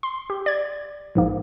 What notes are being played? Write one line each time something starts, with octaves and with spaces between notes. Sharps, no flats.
C6
G4
D5 G#6
A#1 G#2 A#3